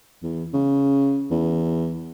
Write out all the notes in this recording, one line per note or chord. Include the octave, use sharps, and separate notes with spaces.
E2
C#3
E2